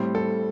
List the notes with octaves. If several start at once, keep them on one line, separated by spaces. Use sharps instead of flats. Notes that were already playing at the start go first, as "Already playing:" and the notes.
Already playing: A2 G3 C4
A4